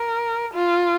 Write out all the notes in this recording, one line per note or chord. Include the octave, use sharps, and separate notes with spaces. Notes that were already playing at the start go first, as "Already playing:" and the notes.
Already playing: A#4
F4